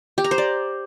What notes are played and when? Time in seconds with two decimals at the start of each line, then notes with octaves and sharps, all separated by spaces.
0.18 G4
0.24 A#5
0.31 C5
0.38 D5